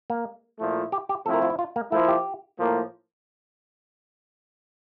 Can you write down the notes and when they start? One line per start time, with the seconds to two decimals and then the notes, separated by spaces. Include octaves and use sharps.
0.10 A#3
0.59 A#2 F3 A3 E4
0.92 G4
1.09 G4
1.26 F3 A3 C4 E4 A4
1.34 A#4
1.42 F4
1.50 E4
1.59 F4
1.76 A#3
1.92 F3 A3 A#3 E4
2.08 G4
2.58 A2 F3 A#3